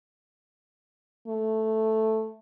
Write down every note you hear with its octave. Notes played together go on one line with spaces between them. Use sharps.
A3